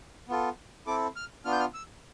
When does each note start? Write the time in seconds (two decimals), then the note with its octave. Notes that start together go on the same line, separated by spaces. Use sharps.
0.29 B3 F4 A4
0.87 C4 E4 A4 D6
1.16 F6
1.45 B3 D4 F4 F6
1.52 G6
1.60 F6
1.74 E6